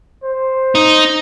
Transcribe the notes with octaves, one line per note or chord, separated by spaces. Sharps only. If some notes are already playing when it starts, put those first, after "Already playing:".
C5
D#4